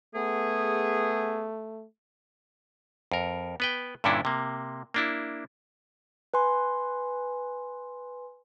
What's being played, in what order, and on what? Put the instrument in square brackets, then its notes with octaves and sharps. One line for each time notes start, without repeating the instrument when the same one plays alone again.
[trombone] A3 [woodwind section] B3 G#4
[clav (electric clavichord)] F2 A#4
B3 B4 G5
G2 A#2 D3 C#4 D4 E4
C3 A#3
A#3 D4 E4
[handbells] B4 G#5 C6